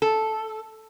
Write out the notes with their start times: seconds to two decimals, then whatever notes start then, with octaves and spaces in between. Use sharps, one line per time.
0.02 A4